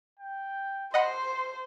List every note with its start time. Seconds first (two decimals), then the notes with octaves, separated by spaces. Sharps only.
0.20 G5
0.94 C5 D#5 F#5 B5 C6